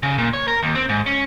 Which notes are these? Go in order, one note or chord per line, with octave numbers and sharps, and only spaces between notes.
C#3
A#2
C#5
A#4
D#2
C4
G#2
C#4